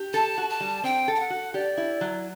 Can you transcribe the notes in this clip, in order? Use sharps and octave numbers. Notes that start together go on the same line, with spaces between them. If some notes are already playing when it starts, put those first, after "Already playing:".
Already playing: G4
A4 A5
F#4
A5
G3
C4 G5
A4
G5
F#5
F#4
G4 D5
E4
F#3